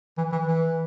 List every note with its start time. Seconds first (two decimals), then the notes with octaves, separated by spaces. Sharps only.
0.17 E3
0.32 E3
0.46 E3